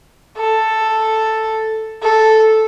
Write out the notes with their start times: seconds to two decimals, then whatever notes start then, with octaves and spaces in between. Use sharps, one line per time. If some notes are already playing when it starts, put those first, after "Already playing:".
0.37 A4
2.02 A4